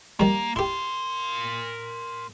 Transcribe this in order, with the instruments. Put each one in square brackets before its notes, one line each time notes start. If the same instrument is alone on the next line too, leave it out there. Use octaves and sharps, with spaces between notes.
[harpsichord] D#3 G3 [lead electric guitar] A#3
[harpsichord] E4 G4 [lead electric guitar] A#4 C6